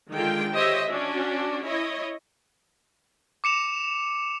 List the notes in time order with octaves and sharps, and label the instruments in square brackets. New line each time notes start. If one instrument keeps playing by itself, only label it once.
[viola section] D3 D#3 G#3 F4 G5
G4 C5 C#5 D#5 E5
C#4 D4 F#4
E4 C#5 D#5
[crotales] D6 C#7 E7 F7